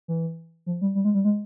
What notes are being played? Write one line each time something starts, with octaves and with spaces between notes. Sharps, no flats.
E3
F3
G3
G3
G#3
G3
G#3